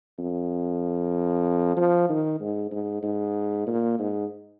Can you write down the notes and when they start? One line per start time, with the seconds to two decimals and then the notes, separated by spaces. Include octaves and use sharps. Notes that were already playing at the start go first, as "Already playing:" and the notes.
0.18 F2
1.77 F3
2.09 D#3
2.40 G#2
2.71 G#2
3.03 G#2
3.67 A#2
3.99 G#2